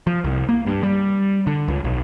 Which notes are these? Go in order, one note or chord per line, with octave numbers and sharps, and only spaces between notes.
F3
C2
A#3
G2
G3
D3
C#2
B1